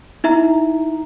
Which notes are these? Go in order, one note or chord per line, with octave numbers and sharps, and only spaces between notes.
D#4 E4 E5 A#5